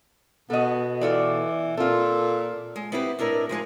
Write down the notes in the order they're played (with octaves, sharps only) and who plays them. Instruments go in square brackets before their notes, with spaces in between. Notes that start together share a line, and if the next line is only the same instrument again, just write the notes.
[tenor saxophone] B2 [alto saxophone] B3 [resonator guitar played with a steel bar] A4 D#5
[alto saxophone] E3 [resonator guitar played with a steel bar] F4 A4 D5
[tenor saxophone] A#2 [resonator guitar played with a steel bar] C4 F4 [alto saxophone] A4
[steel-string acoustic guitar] G#3
B3 C4 E4 G4 G#4 B4
A2 D4 E4 A#4 D#5
F3 G#3 D#4 G#4